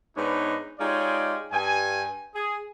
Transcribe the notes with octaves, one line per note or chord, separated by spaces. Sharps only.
G#2 B3 D4 D#4 B4 C#5
G#3 D#4 F4 G4 C#5 D5
G2 G#5
G#4